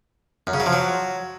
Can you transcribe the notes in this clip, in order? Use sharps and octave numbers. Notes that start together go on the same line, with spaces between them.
F#2
C#3
F#3
F3
F#3